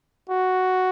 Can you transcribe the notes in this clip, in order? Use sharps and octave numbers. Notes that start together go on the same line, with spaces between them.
F#4